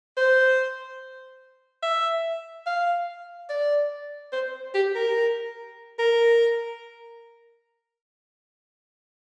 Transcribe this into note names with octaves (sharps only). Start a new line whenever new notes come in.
C5
E5
F5
D5
C5
G4
A#4
A#4